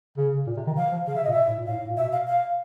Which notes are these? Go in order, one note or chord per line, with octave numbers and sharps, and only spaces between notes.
C#3
A#2
C3
D#3
F3 F5
F3
C#3 F5
C3 E5
A#2 D#5
B2 E5
A2
A#2
A2 F5
A2
A#2
B2 E5
F5
F5